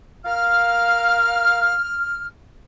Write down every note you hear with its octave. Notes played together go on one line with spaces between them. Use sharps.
A#4 F5 F6